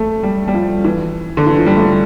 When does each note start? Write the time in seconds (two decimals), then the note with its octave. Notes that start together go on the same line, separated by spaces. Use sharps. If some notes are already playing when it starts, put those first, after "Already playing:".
Already playing: A3
0.23 G3
0.48 G3
0.54 F3
0.85 E3
1.37 D3
1.47 E3
1.56 F3
1.66 G3
1.77 A3